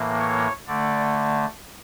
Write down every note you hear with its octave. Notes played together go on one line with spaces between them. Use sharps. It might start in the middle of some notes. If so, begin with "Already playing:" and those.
Already playing: A2 E3 A#3
C#5
D3 A3 D5